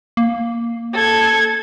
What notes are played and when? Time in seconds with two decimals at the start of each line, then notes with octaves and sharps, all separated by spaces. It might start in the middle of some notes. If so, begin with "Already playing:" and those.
0.17 A#3
0.93 A4 G#6